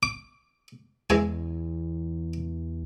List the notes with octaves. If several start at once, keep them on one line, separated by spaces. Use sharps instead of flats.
D6
E2 E3 G#3 G#5